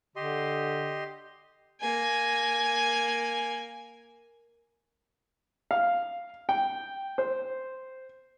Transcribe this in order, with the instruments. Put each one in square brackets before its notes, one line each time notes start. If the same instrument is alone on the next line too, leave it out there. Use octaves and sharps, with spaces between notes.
[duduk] D3 [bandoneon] G4 D#5 C6
[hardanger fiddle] A#3 G#5
[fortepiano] F5
G5
C5